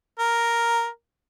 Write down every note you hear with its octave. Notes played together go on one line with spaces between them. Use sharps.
A#4